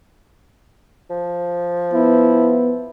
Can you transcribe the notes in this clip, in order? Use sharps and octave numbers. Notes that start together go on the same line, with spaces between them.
F3
B3 E4